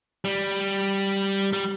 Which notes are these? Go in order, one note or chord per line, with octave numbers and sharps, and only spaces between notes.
G3
G3